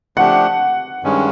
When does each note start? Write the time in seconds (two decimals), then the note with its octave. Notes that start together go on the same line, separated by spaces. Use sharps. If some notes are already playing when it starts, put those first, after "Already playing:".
0.17 F3 A3 D4 G4 F#5
1.03 G2 D#3 G#3 C#4